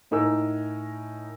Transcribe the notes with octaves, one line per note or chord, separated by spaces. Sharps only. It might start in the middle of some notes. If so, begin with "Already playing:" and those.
A2 D#4 A#4 G#5 E6